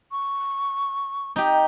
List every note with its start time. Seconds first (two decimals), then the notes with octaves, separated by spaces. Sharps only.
0.12 C#6
1.36 D#4 G4